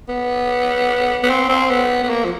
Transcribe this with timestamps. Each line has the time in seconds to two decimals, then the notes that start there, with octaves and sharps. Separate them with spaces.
0.08 B3
1.23 B3
1.30 C4
1.49 C4
1.70 B3
2.03 B3
2.09 A#3
2.24 F3